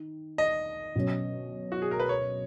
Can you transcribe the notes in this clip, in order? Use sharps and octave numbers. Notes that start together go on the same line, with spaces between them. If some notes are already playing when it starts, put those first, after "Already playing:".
Already playing: D#3
D#5
B2 F#3 C#4
F#4
G#4
A#4
B4
C#5